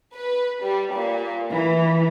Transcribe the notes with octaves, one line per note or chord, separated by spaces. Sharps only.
B4
G3
A#2
E3